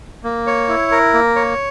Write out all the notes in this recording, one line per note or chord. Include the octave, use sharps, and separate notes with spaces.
A#3
C#5
E4
A#4
A#3
C#5